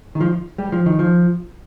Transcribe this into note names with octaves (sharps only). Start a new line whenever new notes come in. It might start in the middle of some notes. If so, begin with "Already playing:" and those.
D#3
F3
G3
F3
D#3
F3